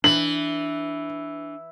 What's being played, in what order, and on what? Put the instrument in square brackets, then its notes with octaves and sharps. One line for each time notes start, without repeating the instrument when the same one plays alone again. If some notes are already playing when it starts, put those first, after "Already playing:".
[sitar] E3 [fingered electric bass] D4 [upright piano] F#7